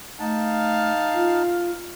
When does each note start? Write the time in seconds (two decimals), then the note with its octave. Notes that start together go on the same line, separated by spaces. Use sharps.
0.20 A3 D#4 F5 A5
1.14 F4